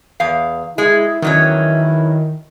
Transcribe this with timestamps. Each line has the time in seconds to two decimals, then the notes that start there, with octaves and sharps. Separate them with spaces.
0.20 E2 F5
0.78 G#3 E4
1.22 E2 D#3 F#3 C#4